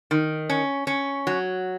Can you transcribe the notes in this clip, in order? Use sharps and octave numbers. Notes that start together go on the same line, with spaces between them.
D#3
C#4
C#4
F#3